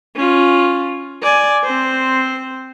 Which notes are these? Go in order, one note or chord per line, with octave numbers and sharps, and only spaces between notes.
C#4 F4
D5 G#5
C4 C5